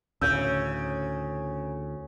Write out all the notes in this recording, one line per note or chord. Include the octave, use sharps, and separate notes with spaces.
D2 A2 C#3 E6 G6